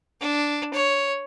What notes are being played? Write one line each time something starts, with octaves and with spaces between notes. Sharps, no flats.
D4
C#5